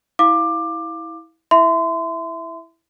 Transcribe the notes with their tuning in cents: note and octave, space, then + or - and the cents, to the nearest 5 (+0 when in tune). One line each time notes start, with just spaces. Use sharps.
E4 -20 F5 +0 D6 +15
E4 +0 E5 +0 C6 -35